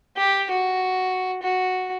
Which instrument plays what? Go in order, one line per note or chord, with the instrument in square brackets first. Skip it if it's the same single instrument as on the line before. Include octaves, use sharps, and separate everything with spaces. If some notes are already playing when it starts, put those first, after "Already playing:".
[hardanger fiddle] G4
F#4
F#4